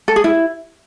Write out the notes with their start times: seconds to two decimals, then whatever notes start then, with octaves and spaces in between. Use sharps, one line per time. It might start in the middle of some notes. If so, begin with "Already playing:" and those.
0.08 A4
0.16 G#4
0.24 E4